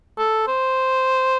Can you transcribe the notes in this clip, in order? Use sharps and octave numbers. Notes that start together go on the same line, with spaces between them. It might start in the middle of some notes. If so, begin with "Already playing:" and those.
A4
C5